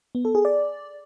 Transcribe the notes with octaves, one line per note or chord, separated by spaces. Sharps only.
B3
A4
G#4
D5